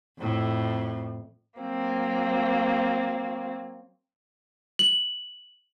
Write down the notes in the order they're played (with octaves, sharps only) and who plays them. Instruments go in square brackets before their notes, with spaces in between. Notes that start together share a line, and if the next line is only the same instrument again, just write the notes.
[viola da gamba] F2 A2
[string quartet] F#3 A#3 C4
[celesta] F#7